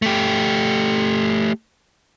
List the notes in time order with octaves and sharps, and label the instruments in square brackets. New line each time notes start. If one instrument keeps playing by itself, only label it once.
[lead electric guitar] A3 G4